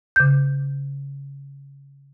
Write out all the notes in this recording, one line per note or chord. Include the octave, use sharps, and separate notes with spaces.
C#3 G6